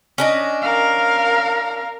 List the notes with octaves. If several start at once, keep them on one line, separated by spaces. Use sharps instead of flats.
C#4 D4 D#5
A#4 F5